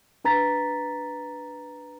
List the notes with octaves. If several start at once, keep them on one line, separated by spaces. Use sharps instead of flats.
D4 B4 A#5 A6 B6